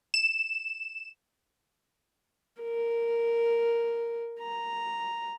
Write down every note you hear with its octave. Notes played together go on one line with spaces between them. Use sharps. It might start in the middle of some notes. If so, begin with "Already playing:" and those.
E7
A#4
A#5